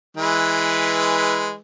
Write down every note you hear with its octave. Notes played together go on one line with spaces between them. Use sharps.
E3 G#3 B4